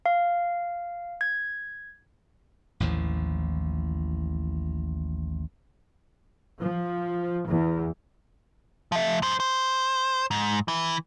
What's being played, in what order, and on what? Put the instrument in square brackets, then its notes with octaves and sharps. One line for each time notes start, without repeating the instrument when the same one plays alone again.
[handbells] F5
G#6
[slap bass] A1 D#2 A2 F3
[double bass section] F3
E2
[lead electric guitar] F3 E5
F#2 C5
C5
G#2
E3